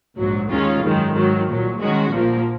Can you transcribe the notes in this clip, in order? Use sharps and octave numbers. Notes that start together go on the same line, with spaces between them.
A#1 G#2 F#3
D#2 D#3 G#3 C#4 F4
G#1 F#2 D#3 G#3
G#2 D#3 F#3
C2 A#2 F#3
D#3 G#3 C#4 F#4
A#1 A#2 F3 A#3